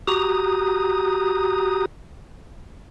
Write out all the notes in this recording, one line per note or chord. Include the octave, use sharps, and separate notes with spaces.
F#4 G4 A#5 D#6